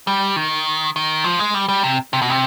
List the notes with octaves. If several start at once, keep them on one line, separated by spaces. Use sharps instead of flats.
G3
D#3
D#3
F3
G#3
G3
G3
C3
C3
B2
C3